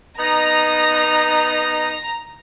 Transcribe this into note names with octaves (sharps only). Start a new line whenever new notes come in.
B3 D#4 A#5